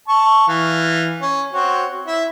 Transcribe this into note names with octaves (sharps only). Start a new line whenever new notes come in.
A5 C#6
E3 F5
C#4
C4 F#4 C#5
E4